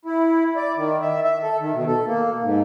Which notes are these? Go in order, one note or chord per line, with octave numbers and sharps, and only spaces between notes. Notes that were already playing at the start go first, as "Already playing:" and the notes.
E4
D5
D#3
E5
E5
A4
D#3
B2
A4
A#3
G#2